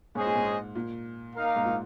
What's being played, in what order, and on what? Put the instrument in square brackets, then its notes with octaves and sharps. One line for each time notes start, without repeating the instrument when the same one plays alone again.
[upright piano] G#2 [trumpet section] G#3 C#4 G#4 C5 D#5
[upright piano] A#2
G#2
A#2
[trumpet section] A#3 D#4 A#4 F5
[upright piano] G#2
A#2